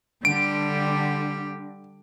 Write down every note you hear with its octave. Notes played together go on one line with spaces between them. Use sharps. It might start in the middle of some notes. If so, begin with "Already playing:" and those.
D3 G3 G4 D7